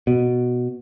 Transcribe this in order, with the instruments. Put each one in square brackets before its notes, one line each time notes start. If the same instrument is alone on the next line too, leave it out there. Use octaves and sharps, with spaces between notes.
[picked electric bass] B2